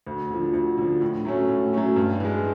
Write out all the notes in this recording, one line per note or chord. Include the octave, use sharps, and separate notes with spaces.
D2
D3 F3
D2
D3 F3
A2
F#3 A3 C#4
A2
F#3 A3 C#4
G2
E3 G#3